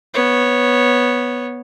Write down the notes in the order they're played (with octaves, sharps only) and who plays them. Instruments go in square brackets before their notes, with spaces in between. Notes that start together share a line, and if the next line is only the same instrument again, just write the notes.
[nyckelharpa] B3 C#5